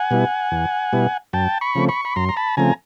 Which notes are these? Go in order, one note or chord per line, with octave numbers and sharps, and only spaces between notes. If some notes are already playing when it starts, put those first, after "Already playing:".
Already playing: F#5 G#5
B2 G3 B3 E4
E2
B2 G3 B3 E4
F#2 G5 A5
B5 C#6
C#3 F3 A3 C4
B5 C#6
B5
F#2 A#5 C6
A#5
A5 B5
C#3 F3 A3 C4 G#5 A#5